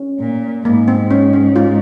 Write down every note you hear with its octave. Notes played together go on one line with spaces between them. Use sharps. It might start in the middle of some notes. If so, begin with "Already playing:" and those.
Already playing: C#4
A#2
G#2 A#3
C4
C#4
C#4
F4